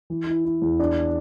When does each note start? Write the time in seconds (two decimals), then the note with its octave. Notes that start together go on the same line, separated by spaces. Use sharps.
0.10 E3
0.27 E4
0.45 E4
0.62 E2
0.79 D4